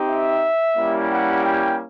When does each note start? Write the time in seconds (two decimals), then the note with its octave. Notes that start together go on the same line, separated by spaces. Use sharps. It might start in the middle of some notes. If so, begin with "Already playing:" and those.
Already playing: C4 D#4 G4
0.09 E5
0.77 G3 A#3 C#4 E4 G4
1.12 F#5
1.46 G5